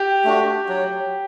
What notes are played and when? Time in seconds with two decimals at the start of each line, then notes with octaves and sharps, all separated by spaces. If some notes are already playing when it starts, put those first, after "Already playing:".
Already playing: G4
0.24 A3 D4 F#4
0.69 F#3